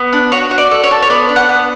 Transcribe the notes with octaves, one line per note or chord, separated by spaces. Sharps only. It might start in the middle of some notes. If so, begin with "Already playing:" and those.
Already playing: B3
D4
F#4 C#5
F#4
D5
A4
C#5
A4
C#5
B3 D5
D4
F#5
B3